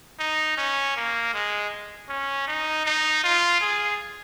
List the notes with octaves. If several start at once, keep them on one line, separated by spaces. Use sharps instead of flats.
D#4
C#4
A#3
G#3
C#4
D#4
D#4
F4
G#4